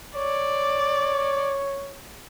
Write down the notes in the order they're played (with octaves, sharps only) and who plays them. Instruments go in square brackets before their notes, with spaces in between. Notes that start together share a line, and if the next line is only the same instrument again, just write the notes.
[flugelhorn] C#5 [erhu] D5